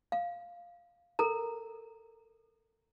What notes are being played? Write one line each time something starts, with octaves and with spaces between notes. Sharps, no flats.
F5
A4 A#4 A#5